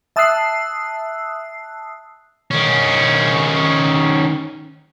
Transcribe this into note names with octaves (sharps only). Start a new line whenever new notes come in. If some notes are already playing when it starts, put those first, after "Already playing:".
E5 A5 D#6 E6 F#6 C7
D#3 C#4